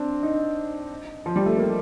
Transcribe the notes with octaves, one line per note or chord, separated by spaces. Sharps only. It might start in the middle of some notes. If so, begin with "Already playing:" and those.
Already playing: C4 D4
D#4
F3
G3
A3
A#3